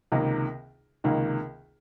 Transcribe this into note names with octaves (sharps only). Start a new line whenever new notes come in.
C#2 C3 D#3 A#3 D#4
C#2 C3 D#3 A#3 D#4